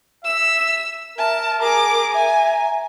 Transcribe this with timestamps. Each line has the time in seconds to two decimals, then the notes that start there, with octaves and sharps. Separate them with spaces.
0.25 E5 E6
1.18 A#4 E5 A5
1.61 G#4 A#4 A#5 D6
2.14 E5 G#5